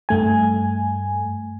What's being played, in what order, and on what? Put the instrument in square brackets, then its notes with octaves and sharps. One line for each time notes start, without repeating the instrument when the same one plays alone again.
[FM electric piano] G2 A3 G#5